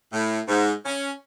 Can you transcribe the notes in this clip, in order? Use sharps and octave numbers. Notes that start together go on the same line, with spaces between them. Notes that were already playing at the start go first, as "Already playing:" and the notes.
A2
G#2
C#4